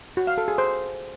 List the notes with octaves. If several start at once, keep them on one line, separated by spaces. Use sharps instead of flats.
F#4
F5
A4
G#4
C5